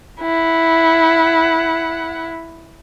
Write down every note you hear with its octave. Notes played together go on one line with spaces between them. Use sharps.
E4 F#5